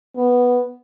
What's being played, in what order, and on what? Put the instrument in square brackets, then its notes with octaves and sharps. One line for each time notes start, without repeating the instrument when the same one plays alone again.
[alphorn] B3